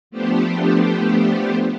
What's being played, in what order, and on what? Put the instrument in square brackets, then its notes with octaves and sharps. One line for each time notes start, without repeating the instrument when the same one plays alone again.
[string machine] F3 A3 B3 D4 G4 C5